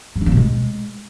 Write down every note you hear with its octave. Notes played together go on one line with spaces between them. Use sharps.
G3
D4
A#3
B2
G#3